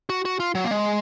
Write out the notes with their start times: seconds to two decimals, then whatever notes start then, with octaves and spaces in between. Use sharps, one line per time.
0.10 F#4
0.25 F#4
0.40 F4
0.55 F#3
0.64 A#3
0.71 G#3